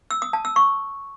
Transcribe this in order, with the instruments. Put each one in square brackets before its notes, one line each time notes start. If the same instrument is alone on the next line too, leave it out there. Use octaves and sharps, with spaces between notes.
[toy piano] E6
D#6
A5
E6
C#6